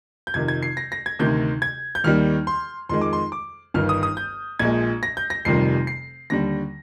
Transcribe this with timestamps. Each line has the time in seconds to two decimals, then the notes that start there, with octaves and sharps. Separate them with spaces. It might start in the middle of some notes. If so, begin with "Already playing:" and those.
0.27 G6
0.34 F2 C3 D#3 G#6
0.48 G#6
0.63 C7
0.77 A#6
0.92 A#6
1.06 G#6
1.19 D2 C3 D#3 G6
1.62 G#6
1.95 G6
2.04 D#2 D#3 G3 F6
2.47 C6
2.89 F2 D#3 G#3 C6
3.01 D6
3.13 C6
3.32 D6
3.74 G1 G2 D#3 F6
3.89 D#6
4.03 D#6
4.17 G6
4.59 A#1 A#2 G#3 G#6
5.03 A#6
5.17 G6
5.30 A#6
5.45 F1 F2 C3 D#3 G3 C7
5.87 C7
6.30 D#2 D3 G3 A#6